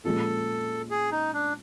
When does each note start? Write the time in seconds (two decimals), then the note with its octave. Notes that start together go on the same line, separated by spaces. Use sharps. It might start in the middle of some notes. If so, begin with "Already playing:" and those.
0.04 A#2 F3 G#3 C#4 F4 A4
0.91 G#4
1.12 D#4
1.34 D4